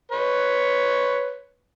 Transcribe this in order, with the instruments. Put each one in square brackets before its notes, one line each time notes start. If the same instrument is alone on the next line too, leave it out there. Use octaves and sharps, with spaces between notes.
[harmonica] B4 C#5